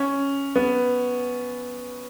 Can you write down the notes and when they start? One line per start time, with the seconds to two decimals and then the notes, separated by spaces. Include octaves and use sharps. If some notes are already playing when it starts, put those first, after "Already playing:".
Already playing: C#4
0.56 B3